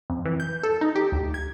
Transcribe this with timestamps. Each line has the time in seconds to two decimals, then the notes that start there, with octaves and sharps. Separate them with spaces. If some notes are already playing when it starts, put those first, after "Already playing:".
0.10 F2
0.25 E3
0.40 G6
0.64 A4
0.81 D#4
0.96 G4
1.12 D2
1.34 G#6